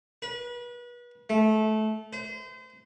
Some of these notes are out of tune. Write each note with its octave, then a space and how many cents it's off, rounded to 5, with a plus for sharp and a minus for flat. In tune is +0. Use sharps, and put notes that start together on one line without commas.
B4 -35
A3 -20
C5 -35